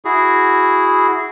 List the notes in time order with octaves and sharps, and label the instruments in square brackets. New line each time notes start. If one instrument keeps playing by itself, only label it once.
[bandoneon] E4 F#4 G#4